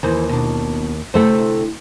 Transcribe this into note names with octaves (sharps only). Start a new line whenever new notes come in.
D#2 E3 C5
B2 D4
D2 C3 A3 E4 A4 C5